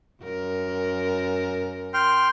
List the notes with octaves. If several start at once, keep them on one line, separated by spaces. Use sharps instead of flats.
F#2 A#4
G5 C6 F6